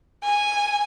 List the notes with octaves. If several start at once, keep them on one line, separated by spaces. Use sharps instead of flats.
G#5